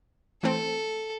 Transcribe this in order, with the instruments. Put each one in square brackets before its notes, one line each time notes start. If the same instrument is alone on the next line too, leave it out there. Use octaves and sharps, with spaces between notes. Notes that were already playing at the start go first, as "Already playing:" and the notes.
[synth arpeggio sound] E3 A3 C4 [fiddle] A4